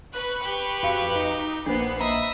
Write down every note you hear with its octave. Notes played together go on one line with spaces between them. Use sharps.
B4 C#6 F#6
G4
F2 F#4 F5
D#4
A#1 A#3 B3 D4 C5 C7
D#5 E5 A#5 B5